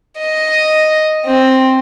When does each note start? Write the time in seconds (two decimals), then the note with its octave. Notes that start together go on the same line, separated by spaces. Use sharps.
0.21 D#5
1.26 C4